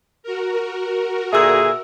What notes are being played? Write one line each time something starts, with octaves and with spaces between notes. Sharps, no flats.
F#4 A#4
A#2 D3 G#4 E5 E6